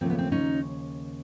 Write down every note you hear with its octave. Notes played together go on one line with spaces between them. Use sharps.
D#2 C#3 F3 A3 C4
B3
C4
C#4 D#4